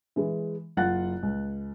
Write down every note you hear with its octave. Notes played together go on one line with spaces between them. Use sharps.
E3 G#3
F#1 F4 F#5 F#6 A6
C#2